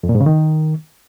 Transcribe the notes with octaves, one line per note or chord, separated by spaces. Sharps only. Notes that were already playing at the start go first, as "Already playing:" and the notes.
F2
A#2
G#2
C#3
D#3